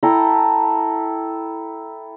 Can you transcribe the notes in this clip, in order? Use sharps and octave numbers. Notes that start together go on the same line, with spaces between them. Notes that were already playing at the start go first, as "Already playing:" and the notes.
E4 A4 G5 A#5